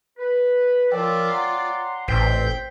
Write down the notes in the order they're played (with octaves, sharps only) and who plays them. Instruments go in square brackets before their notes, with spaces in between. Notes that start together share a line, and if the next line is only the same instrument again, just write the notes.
[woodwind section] B4
[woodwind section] F3 A#4 E5 [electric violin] F4 D5 [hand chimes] C#5 G5
[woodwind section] F#5 A#5 C6
[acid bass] A1 [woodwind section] A#2 E3 C4 [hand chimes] C5 B6 C7 [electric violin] G5